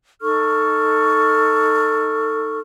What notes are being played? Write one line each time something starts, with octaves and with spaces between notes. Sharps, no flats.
D#4 A4 C#6 F6